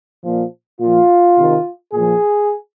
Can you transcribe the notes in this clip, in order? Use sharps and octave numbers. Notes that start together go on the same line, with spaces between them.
A#2 F3
A#2 F3 F4
C3 D#3
A#2 F3 G#4